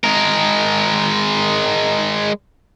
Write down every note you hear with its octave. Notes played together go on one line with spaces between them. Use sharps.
G#3 A#4